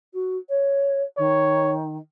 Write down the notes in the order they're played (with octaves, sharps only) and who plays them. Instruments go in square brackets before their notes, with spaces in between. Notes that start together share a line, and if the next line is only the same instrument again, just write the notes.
[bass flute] F#4
C#5
[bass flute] D#3 [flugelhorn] C#5